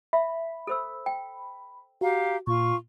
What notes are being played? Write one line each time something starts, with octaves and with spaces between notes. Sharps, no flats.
E5 B5
A4 C5 E6
G5
F#4 G4 F5 A#5
A#2 F4 C#6